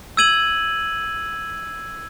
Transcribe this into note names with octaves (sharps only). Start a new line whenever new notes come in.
E6 G#6 D#7 F#7